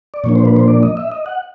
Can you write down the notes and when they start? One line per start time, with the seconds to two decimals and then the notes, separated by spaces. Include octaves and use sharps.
0.14 D5
0.24 A#2 F3 A#3 D4 C#5
0.35 C5
0.45 B4
0.56 C5
0.68 D5
0.83 D#5
0.97 E5
1.12 D#5
1.26 F#5